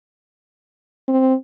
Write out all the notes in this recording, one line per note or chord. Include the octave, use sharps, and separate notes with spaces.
C4